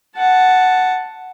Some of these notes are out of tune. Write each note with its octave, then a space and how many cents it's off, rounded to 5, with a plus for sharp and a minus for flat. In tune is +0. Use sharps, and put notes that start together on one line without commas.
F#5 +0 A5 +0